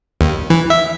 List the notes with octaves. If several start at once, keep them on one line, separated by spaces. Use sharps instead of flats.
D#2
E3
E5